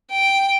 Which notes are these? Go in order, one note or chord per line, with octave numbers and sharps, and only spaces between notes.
G5